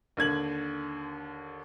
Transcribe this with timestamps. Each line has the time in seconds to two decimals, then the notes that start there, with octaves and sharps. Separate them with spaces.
0.17 D#2 D3 G#6 F#7